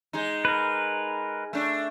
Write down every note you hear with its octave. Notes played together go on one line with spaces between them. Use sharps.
G#3 D#4
A#4 B4
A3 D4